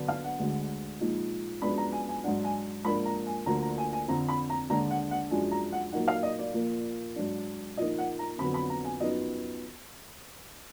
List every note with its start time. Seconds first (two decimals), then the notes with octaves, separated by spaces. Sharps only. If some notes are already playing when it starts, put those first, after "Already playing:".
Already playing: D3 F#3 B3 D4
0.08 F5
0.24 F#5
0.39 D2 D3 G#3
1.01 A#2 F3 G#3 D#4
1.62 F#2 F3 G#3 B3 D4 B5
1.78 A#5
1.92 G#5
2.09 G#5
2.24 G#2 F#3 D4 F#5
2.44 G#5
2.85 G#2 F3 A#3 D4 B5
3.05 A#5
3.27 G#5
3.46 D2 D3 F3 A#3 A#5
3.62 A#5
3.78 G#5
3.93 G#5
4.08 F2 D3 F3 A#5
4.28 B5
4.50 A#5
4.69 D#2 D3 G#3 D4 A#5
4.91 F#5
5.11 F#5
5.31 F#2 F3 G#3 D4 G#5
5.51 A#5
5.73 F#5
5.93 A#2 F#3 A#3 D#4 F#5
6.08 F5
6.23 D#5
6.39 D5
6.54 A#2 F3 A#3
7.16 G#2 F#3 D4
7.77 A#2 F3 A#3 D#4 D#5
7.98 F#5
8.19 A#5
8.38 F2 D3 F#3 B3 B5
8.54 B5
8.70 A#5
8.85 G#5
9.00 F#2 F3 B3 D#4 D#5